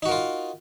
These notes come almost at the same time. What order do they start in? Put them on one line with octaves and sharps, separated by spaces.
D#4 F#4 A#4 F4